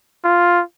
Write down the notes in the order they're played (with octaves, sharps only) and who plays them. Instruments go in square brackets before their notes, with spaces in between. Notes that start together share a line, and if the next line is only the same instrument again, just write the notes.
[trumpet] F4